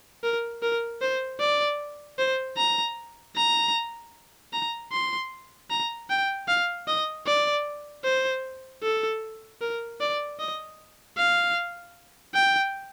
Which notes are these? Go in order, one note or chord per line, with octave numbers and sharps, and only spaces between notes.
A#4
A#4
C5
D5
C5
A#5
A#5
A#5
C6
A#5
G5
F5
D#5
D5
C5
A4
A#4
D5
D#5
F5
G5